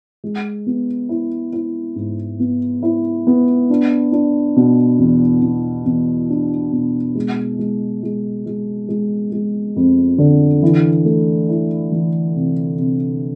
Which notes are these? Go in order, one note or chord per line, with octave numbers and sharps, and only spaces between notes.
G#3
B3
E4
E4
G#2
B3
E4
B3
D4
D4
B2
E2
E2
E2
D4
B2
G#3
G#3
G#3
G#3
G#3
G#3
F2
D3
E3
A3
E4
E3
C3
C3